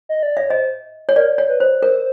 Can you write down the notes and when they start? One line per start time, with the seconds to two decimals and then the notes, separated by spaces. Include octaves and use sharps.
0.09 D#5
0.23 D5
0.37 C#5 E5
0.50 C5 D#5
1.09 C#5
1.16 A#4 D5
1.38 C#5
1.49 B4
1.60 C5
1.82 A#4 C5